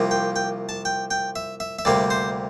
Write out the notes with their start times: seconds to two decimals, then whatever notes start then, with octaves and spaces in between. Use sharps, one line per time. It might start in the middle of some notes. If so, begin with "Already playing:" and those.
Already playing: C2 C3 F3 A#3
0.11 G5
0.36 G5
0.69 A5
0.85 G5
1.11 G5
1.36 E5
1.60 E5
1.79 E5
1.85 D2 C3 G3 A#3 D5
2.10 C5